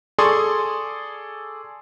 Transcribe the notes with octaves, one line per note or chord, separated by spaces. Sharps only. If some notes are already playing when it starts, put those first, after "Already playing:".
G#4 A4 D5 C6 C#6 D#6